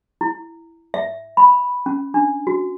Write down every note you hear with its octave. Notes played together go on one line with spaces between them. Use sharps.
E4
E5
B5
C#4
D4
F#4